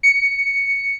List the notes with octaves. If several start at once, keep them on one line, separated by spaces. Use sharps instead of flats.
C#7